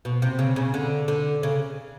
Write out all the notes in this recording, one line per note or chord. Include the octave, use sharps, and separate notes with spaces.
B2
C3
C#3
C#3
D3
D3
C#3